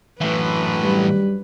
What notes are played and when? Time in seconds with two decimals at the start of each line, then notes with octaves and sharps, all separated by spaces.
0.21 F#2 A2 E3 D4 B4
0.84 G3